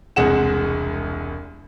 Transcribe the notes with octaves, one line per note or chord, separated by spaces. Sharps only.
E1 C2 G#3 G#4 F#5 E7